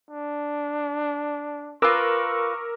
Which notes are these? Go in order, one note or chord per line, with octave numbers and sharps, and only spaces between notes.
D4
F4 A#4 B4 C#6 D6 E6